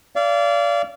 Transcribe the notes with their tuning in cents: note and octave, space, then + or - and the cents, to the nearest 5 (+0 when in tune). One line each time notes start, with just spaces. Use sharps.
D5 -25 F5 -30